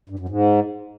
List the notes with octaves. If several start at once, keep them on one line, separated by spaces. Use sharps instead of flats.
G2
F#2
G#2